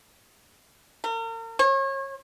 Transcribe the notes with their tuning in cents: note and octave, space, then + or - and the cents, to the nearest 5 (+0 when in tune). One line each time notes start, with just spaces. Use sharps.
A#4 -40
C#5 -35